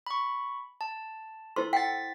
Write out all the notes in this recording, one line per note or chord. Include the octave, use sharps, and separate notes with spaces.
B5 C#6
A5
E4 A4 C5 C6
F#5 G5 A6 B6